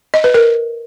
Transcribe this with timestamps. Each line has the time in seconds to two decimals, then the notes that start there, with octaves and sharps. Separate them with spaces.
0.14 D#5
0.24 B4
0.34 A#4